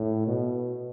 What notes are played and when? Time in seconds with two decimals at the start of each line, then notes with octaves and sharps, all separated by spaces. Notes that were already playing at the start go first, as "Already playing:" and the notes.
Already playing: A2
0.27 B2